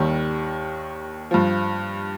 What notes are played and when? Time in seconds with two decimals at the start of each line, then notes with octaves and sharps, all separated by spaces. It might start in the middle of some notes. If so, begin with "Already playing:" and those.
Already playing: D#2 D#3 G3
1.31 G2 F3